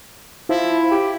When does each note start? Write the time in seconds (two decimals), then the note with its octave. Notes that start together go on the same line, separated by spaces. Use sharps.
0.49 F3 E4
0.91 G4